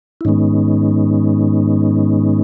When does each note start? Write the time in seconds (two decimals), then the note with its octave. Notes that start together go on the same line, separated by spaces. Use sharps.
0.21 E4
0.25 G#2 D#3 G#3 B3 C#4 D#4